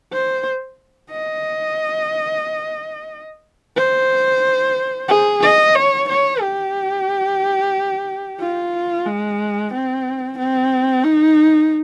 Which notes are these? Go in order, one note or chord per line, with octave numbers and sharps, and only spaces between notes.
C5
D#5
C5
G#4
D#5
C#5
C#5
G4
F4
G#3
C4
C4
D#4